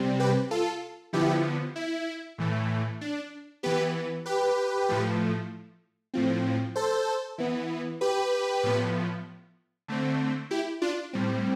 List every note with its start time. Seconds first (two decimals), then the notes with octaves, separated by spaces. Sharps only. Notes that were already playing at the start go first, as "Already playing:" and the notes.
Already playing: C3 G3 C4
0.20 G4 B4
0.51 F4 A4
1.13 D3 F3 B3 E4 G4
1.76 E4
2.38 A2 E3 A3
3.01 D4
3.63 E3 B3 G4 B4
4.26 G4 B4
4.89 A2 F3 A3
6.14 A2 F3 C4
6.76 A4 C5
7.38 E3 B3
8.01 G4 B4
8.63 A2 F3 B3
9.88 D3 A3 C4
10.51 E4 G4
10.82 D4 F4
11.13 A2 G3 C4